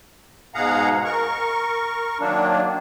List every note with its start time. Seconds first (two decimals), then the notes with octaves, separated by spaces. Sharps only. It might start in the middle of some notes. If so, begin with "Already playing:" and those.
0.55 G#2 B2 G#4 F5 F#5 A#5
1.05 A#4 C#6
2.20 D#3 F#3 A#3 D4